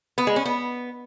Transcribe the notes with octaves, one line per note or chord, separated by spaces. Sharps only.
B3
G#3
C#4
B3